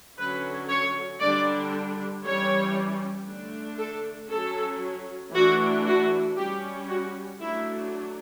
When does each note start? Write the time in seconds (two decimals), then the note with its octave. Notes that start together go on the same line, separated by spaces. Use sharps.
0.17 D3 F#3 C#4 B4
0.68 C#5
1.20 D3 G3 D4 D5
2.24 E3 G3 C#4 C#5
3.27 D3 A3 D4
3.78 A4
4.31 F#3 C#4 A4
5.34 E3 A3 D4 F#4
5.86 F#4
6.37 G3 C#4 G4
6.88 F#4
7.40 F#3 A3 D4 E4